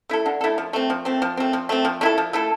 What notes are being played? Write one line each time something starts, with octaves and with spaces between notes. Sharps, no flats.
A3 E4 A4
D3
A3 E4 A4
F3
A3 C4
F3
A3 C4
F3
A3 C4
F3
A3 C4
F3
A3 E4 A4
F3
A3 E4 A4